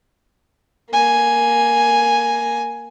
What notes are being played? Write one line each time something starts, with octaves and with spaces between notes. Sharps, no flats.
A#3 G#5